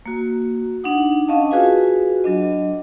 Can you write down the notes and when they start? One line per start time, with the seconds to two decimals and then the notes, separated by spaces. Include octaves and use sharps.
0.06 A#3 F#4
0.84 D4 D#4 F#5 D#6
1.28 C#4 D4 D#5 F5 A5
1.51 F4 F#4 G#4 B4 G#5
2.24 F#3 D4 D#5